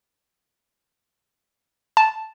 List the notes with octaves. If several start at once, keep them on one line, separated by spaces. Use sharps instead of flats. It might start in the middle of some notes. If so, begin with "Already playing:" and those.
A5